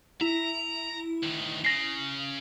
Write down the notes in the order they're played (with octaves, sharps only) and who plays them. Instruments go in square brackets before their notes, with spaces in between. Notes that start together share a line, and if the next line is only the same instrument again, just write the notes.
[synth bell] E4 [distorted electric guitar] A#5
[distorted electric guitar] D2 D#3
[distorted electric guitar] C#3 [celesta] A#6 C7